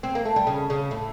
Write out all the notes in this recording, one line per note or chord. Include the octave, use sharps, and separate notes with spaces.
C4
A#3
A3
G3
C#3
C#3
A2